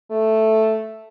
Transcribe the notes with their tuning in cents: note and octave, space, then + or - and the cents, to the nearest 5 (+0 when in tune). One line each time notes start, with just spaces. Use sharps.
A3 +0